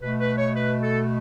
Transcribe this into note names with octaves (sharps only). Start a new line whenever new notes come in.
B2 A3 B4
B4
C#5
B4
A4